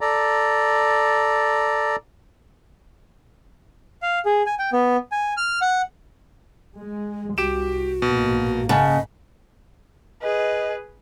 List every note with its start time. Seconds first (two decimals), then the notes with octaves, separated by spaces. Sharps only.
0.01 A4 D5 A#5
4.02 F5
4.25 G#4
4.46 G#5
4.59 G5
4.73 B3
5.12 G#5
5.37 F6
5.61 F#5
6.78 G#3
7.38 C2 F#4 G4 D7 E7
8.02 A#1 G#2 B2 A#3
8.69 C#3 D#5 F#5 A5
10.22 G#4 B4 D#5